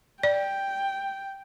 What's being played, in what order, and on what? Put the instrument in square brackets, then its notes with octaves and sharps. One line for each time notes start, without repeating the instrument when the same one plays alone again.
[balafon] D5 [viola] G5